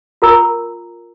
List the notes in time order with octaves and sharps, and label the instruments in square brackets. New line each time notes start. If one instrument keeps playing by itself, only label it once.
[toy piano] F4 A#4 A#5 E6